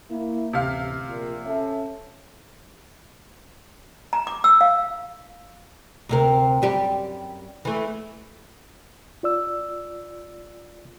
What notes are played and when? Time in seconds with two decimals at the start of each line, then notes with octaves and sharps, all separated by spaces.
0.10 A#3 E4
0.53 A1 D2 C3 F5
1.08 A#1 A#2
1.46 C#4 A4 E5
4.13 A#5
4.27 D6
4.44 E6
4.61 F5
6.09 D2 C3 A#4
6.62 F#2 G3 G4
7.65 E3 A3
9.23 F4 D5 E6